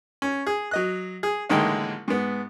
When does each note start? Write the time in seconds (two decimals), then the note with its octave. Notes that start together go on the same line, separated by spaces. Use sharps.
0.22 C#4
0.47 G#4
0.71 F#3 D#5 F#6
1.23 G#4
1.49 A1 D3 D#3 G#3 A#3 G5
2.08 G#2 B3